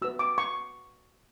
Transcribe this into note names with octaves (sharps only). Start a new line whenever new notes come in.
F#4 B4 E6
D6
C#6